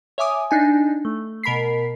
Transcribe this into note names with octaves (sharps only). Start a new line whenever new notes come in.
C#5 E5 G#5 D6 D#6
D4 D#4 G#5
A3
B2 A#4 B5 B6 C7